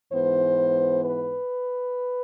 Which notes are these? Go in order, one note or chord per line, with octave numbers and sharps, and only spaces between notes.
G#2 E3 B3 C5
B4